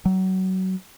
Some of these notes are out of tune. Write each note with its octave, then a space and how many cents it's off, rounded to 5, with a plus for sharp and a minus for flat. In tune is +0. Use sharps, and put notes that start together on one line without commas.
F#3 +25